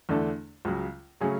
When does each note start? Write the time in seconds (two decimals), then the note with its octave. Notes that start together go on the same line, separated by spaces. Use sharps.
0.09 E2 D3 A3 D4 A4
0.65 C#2 C#3 F#3
1.20 C#3 F#3 A3 C#4 G#4